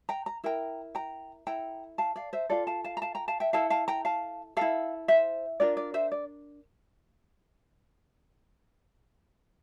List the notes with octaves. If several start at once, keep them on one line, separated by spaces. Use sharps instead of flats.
G5 A#5
A#5
E4 A#4 G5 A#5
G5 A#5
E4 A4 G5 A#5
F5 A5
D5 F5
C5 E5
F4 A4 D5 F5
F5 A5
F5 A5
A#5
F5 A5
G5 A#5
F5 A5
E5 G5
E4 A4 F5 A5
F5 A5
G5 A#5
F5 A5
E4 A4 D5 F5
C5 E5
D4 F4 A#4 D5
D5
C5 E5
D5